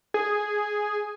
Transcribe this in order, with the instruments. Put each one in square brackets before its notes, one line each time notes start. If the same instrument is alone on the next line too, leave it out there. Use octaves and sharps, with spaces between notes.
[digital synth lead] G#4